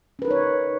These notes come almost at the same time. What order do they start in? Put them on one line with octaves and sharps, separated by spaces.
C#4 B4 A#4 D#4 C#5